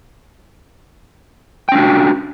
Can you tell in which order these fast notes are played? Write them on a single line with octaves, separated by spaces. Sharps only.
G5 C#4 D4 F#4